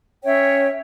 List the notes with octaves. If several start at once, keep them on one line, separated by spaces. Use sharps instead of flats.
C#4 C#5 E5 G5